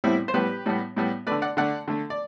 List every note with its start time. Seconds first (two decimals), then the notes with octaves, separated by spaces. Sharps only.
0.04 A2 G3 B3 C4 E4
0.28 C5
0.34 A2 G3 B3 G4 B4
0.66 A2 G3 B3
0.97 A2 G3 B3
1.27 D3 A3 B4 D5
1.42 D5 F#5
1.57 D3 A3 D5 F#5
1.88 D3 A3
2.10 D5